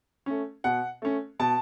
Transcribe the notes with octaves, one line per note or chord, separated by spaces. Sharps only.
A3 C#4
B2 F#5
A3 C#4
B2 A5